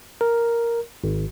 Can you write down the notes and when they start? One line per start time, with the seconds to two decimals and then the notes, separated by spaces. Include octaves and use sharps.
0.21 A#4
1.04 G#1